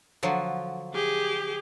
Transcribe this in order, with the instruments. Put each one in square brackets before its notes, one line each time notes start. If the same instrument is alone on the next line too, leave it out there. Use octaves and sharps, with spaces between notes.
[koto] D3 F3 F#3
[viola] G4 G#4